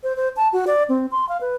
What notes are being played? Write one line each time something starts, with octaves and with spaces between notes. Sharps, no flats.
C5
C5
A5
F#4
D5
C4
C6
F5
B4